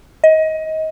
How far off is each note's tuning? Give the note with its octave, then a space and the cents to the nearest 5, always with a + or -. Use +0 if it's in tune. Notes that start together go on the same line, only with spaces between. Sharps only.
D#5 +25